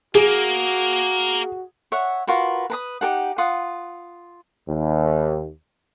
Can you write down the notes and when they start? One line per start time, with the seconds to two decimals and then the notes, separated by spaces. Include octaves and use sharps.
0.15 A#3 F#4 G#4
1.92 C#5 E5 F#5
2.27 F4 F#4 A#4 B4
2.70 B4 A#5 D#6
3.01 D#4 G4 A4 F#5
3.38 F4 F#5 D#6
4.69 D#2